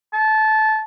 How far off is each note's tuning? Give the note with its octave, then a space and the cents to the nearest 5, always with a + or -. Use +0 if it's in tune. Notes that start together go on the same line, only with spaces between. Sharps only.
A5 -20